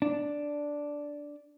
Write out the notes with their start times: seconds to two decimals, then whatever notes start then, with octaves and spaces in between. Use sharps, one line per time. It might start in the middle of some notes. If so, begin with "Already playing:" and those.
0.02 D4